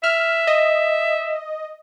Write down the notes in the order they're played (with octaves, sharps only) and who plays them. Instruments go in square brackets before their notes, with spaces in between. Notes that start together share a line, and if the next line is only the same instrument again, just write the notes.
[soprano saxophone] E5 [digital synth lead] F6
[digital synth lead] D#5